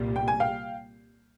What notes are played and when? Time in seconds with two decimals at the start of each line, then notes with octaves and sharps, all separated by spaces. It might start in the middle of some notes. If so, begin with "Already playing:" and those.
Already playing: C2 A#2 G3
0.16 G5
0.28 G#5
0.40 F5 G5